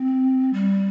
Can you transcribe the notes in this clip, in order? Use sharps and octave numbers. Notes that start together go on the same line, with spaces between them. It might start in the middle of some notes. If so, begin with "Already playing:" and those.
Already playing: C4
G3